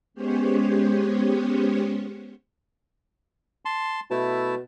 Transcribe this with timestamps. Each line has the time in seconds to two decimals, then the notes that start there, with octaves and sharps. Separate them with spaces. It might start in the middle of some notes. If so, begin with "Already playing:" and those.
0.14 G#3 B3 C#4 G4 C5 C#5
3.65 A5 C6
4.11 B2 A3 E4 A5